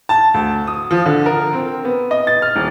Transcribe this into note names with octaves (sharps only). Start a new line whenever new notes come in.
A5
D2
D#6
F3
D3
A#4
C4
B3
D#5
A6
F6
D#1